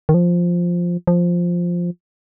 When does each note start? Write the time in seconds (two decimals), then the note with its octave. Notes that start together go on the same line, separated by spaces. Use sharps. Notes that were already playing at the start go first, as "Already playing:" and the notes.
0.09 D#3
0.14 F3
1.07 F3